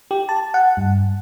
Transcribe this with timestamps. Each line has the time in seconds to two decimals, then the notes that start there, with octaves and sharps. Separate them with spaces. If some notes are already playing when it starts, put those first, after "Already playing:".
0.11 G4
0.29 A5
0.54 F#5
0.77 G2